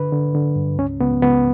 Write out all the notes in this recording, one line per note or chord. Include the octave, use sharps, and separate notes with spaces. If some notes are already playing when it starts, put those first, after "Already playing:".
Already playing: D3 B4
D3
D3
G2
C#2 C#4
C#2 B3
C#2 B3